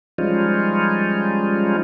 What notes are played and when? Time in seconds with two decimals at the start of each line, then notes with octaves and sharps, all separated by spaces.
0.18 F3 G3 G#3 C#4 D#4 F4